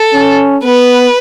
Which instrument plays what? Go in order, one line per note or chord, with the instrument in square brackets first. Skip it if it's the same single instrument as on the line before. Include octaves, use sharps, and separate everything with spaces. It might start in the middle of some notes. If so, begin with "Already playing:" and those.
Already playing: [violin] A4
[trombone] C#4
[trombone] B3 [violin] B4